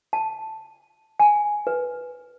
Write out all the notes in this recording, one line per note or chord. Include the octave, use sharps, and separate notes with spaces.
A5
G#5
B4